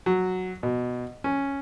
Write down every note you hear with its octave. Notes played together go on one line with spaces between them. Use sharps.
F#3
B2
C#4